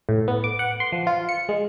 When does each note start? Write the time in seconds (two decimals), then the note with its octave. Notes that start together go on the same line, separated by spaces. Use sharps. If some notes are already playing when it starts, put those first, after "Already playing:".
0.09 A2
0.28 B3
0.44 D6
0.59 F#5
0.80 C6
0.92 F3
1.07 F4
1.29 C#7
1.49 G#3